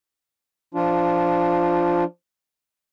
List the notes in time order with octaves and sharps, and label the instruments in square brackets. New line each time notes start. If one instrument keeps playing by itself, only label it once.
[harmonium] F3 D4 F4